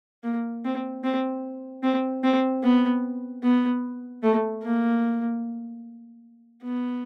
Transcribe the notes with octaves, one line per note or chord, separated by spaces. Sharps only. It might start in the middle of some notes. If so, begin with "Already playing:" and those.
A#3
C4
C4
C4
C4
B3
B3
A3
A#3
B3